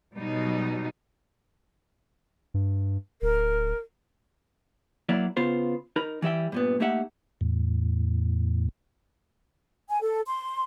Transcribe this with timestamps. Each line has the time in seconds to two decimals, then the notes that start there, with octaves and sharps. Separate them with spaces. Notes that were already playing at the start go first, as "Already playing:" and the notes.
0.15 B2 F#3 G3 D#4
2.54 G2
3.22 D1 A#4
5.09 F#3 A#3 E4 D5
5.37 C#3 B3 F4 C5
5.96 D#4 A#4 B5
6.22 E3 G3 E5 G5
6.52 G2 A#2 B3
6.80 A3 A#3 D#4 G4 E5 F#5
7.41 E2 A2
9.89 G#5
10.02 A4
10.26 C6